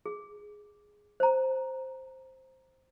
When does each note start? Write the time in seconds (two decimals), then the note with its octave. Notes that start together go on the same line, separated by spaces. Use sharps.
0.06 G#4
1.20 C5 A#5